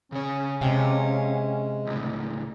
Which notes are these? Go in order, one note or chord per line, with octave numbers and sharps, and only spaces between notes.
C#3 C#4 C#5
C3 G#3 F5 G5
C#2 A2